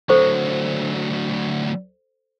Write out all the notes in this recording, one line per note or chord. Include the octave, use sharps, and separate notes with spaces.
D2 F#3 A4 C5 C#6